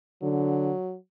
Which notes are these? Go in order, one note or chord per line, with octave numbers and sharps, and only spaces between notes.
D3 F#3